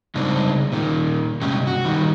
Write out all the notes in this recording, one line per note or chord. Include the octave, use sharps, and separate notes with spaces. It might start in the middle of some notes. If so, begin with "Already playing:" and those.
C#3 G3 G#3 C4 D4 D#4
A#2 D#3
G2 C3 G#3 C#4 G4
F#4
D#3 G3